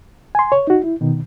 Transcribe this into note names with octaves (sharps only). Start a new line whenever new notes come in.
G#5 C6
C#5
D#4 F#4
E4
B2 D#3